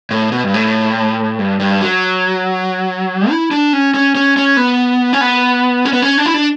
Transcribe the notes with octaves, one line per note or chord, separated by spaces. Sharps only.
A2
B2
G2
A2
G2
G2
F#3
E4
D4
C#4
C#4
C#4
C#4
B3
C#4
B3
C#4
B3
C#4
D4
E4
D4